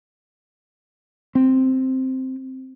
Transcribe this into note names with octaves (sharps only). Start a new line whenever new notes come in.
C4